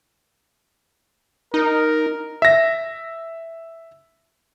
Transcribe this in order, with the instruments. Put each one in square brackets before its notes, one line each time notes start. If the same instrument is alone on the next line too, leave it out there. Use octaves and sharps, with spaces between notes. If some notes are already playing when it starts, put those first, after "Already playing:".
[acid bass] D#4 [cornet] A#4
[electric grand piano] E5 A#6